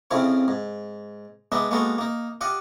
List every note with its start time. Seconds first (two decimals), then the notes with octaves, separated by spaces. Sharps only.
0.11 F2 C#3 F3 C4 E4 F4
0.48 G#2
1.52 G#3 B3 D4 D#4 E5
1.71 G#3 A#3 B3 F#4 A4
1.98 A#3 D#4
2.41 F4 G4 D#5 F#5